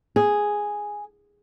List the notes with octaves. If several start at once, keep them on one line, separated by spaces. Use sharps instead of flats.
G#4